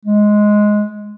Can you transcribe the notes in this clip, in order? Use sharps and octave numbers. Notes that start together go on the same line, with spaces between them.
G#3